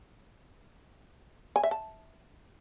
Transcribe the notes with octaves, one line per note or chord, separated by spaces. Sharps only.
G#5
E5
A5